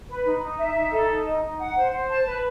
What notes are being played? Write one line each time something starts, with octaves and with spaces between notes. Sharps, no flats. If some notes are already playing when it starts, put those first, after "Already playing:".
B4
D#4
D#4
E5
D#4
A4
D#4
D#5
D#4
F#5
C5
C5
A5
B4